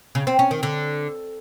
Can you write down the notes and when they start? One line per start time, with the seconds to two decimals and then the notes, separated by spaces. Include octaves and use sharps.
0.15 C#3
0.27 C4
0.39 C#4
0.51 D#3
0.63 D3